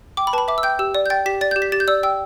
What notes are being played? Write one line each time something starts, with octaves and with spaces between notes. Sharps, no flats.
G5 D6
B5
B4 A5 B5
E5 D6
E6
G5 G6
G4 E6
D5
G6
G5 A6
G4 B6
D5 A6
G4 G6
B6
G4 A6
G6
D5 E6
G5 E6